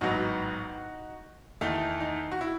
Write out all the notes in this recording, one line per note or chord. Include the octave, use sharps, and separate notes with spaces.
A1 G#2 F#3 B3 D#4 F#4
E2 D#3 A3 D#4
D#4
F#4
E4